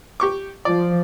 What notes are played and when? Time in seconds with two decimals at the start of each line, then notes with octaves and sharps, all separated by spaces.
0.20 G4 C#6 D6
0.65 F3 D5